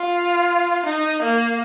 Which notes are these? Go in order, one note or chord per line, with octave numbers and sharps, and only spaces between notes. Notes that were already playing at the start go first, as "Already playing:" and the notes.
Already playing: F4
D#4
A#3